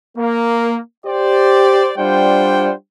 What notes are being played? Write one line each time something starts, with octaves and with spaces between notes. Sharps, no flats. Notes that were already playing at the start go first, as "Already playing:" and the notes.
A#3
G4 C5 D5
G3 D4 F4 C5 F#5 G5